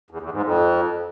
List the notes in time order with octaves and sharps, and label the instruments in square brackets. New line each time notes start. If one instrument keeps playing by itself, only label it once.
[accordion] E2
E2
G#2
F2